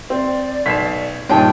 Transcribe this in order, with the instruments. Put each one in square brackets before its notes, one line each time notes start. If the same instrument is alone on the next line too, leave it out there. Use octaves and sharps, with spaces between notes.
[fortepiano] C4 [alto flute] D5
[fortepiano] B1 [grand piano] B6 C7 E7
[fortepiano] G2 A#2 D#3 [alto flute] D#4 [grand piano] C#5 A5 [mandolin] G5